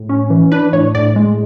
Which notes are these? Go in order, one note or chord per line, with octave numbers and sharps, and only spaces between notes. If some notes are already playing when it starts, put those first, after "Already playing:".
Already playing: A2
C#4
E3
D4 B4
A2 C#5
A2 D5
G#3